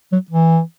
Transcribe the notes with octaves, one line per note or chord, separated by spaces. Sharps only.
F#3
E3